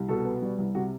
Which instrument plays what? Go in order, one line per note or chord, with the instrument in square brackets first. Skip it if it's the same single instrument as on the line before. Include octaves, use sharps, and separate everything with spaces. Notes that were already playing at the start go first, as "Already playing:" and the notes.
Already playing: [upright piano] C2
B2 A4
B3
G3
C2
C3 F#4